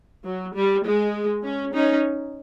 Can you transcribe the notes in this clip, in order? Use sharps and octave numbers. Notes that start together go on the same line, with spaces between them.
F#3
G3
G#3
C#4
C#4 D#4